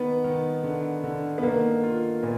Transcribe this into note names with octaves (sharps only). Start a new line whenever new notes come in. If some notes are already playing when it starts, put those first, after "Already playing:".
Already playing: D#3 B3
D#3
D3
D3
B3
D#3 A#3
F4
A#2 B3